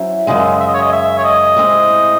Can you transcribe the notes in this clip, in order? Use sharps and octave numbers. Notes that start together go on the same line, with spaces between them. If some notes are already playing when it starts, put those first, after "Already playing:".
Already playing: F#3 C#4 E4 C5
F#2 C#3 G#3 D#5
E5
D#5
C#5
D#5
E5
C#5
D#5
A2 G#3 C4